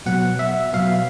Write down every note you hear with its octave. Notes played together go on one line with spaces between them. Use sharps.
B2 F#3 B3 F#5
E5
B2 F#3 B3 F5